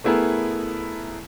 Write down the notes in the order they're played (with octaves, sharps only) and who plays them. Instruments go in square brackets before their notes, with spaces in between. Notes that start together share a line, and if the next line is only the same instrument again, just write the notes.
[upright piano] A3 B3 E4 G#4 A#4